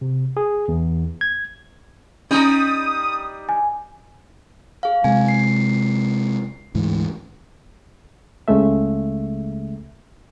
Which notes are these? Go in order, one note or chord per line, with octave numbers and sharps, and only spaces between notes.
C3
G#4
E2
G#6
G3 C#4 D#4 A#5 D#6
G#5
G#4 F5
C3 G#3 G#5
C7
D2 G#2 E3
C#2 C#3 G#3 A3 E5